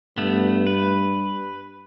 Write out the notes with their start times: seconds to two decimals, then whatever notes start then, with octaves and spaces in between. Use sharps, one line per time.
0.18 G2 A3 B3
0.67 B4